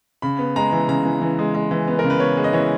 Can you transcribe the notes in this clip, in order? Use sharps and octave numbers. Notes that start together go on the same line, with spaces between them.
C#3 B5
B3
G#3 A#5
E3
C#3 A#5
E3
E3
G#3
G#3
E3
B3
A#4
C#3
B4
B3 C#5
G#3
D#5
E3 C#5